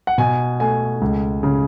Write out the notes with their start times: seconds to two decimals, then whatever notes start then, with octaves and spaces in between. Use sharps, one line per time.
0.07 F#5
0.18 B2 G#5
0.60 A3 G#5
1.01 C#2
1.43 C#3